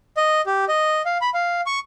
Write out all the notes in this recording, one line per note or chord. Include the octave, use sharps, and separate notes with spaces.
D#5
G4
D#5
F5
B5
F5
C#6